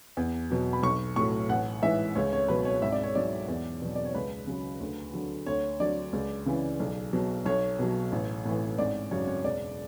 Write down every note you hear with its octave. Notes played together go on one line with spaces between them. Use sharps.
E2
B2 F#3
B5
B1 C#6
A2 F#3 C#6
A1 F#5
G#2 E3 E5
C#2 C#5
C#5
B2 F#3 B4
C#5
G#1 E5
D5
C#5
G#2 F#3 D5
E2
B2 F#3
D5
C#5
C#2 B4
C#3 F#3
D2
D3 F#3
D2 C#5
D3 F#3 D5
C#2
C#3 E3
B1
B2 F#3
B1 C#5
B2 F#3
A1
A2 E3
G#1 D5
F#2 C#3 F#3 C#5
C#5
E1 D5